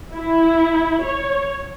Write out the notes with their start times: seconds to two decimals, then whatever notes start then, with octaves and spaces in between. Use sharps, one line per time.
0.15 E4
1.04 C#5